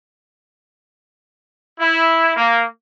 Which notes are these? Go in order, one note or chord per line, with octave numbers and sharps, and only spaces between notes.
E4
A#3